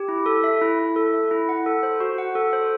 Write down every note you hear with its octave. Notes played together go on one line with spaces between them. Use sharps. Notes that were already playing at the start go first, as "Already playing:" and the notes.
Already playing: G4
E4
A4
E5
E4
E4
A4
E5
E4
F#5
A4
C5
F#4
F#5
A4
C5